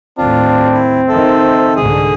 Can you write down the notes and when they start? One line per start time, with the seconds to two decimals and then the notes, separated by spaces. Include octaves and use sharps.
0.18 D#2 A2 C4 D4 F4
0.74 E4
1.09 D#3 A4 C5 E5
1.76 C2 G#2 D3 G#4